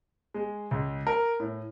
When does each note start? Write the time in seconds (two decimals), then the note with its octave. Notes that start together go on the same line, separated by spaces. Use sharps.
0.34 G#3
0.71 C#2
1.07 A#4
1.40 A2